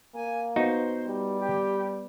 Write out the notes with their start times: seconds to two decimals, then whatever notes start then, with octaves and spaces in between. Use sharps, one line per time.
0.15 A#3 G#5
0.56 B3 D#4 F#4 C5
1.08 G3
1.39 G4